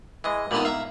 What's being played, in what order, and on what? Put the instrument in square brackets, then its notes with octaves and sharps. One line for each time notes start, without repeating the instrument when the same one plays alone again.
[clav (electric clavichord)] E3 G#3 [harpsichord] D#5
[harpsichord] A#2 B3 D#4 [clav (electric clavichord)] D3 E3 G3
[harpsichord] E5 A#5 [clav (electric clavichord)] F5